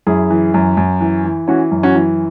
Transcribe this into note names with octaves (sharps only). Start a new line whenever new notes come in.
F#2 E4 G#4
E3
F#2
F#2
E3
E3
E3 C#4 F#4
F#2
C#4 F#4
E3